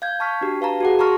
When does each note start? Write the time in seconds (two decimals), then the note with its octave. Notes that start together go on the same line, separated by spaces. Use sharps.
0.02 F5 G6 G#6
0.20 A5 C#6 F6 B6
0.41 D4 F#4 G4
0.61 B4 F5 A5 A#5
0.80 F#4 G#4 F#5
0.99 A5 A#5 C6 C#6 F6 A#6